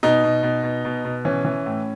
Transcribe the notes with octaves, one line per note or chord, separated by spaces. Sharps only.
B2 D#4
B2
B2
B2
B2
B2
E3 C#4
E3
A2